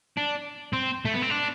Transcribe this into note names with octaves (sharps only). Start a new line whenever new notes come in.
D4
C4
A3
B3
C4
D4